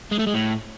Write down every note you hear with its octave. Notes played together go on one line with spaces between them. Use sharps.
G#3
A3
G#3
A2